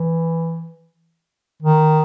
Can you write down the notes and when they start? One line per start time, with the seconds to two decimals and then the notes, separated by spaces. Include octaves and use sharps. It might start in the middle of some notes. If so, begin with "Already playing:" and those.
Already playing: E3
1.62 D#3